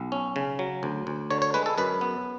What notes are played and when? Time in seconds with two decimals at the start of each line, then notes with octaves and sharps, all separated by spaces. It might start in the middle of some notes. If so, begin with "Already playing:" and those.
Already playing: B1
0.12 C#4
0.36 C#3
0.59 F#3
0.83 D2
1.07 D2
1.30 D3 C#5
1.42 C#5
1.54 G#3 B4
1.66 A4
1.78 F#2 B4
2.01 B3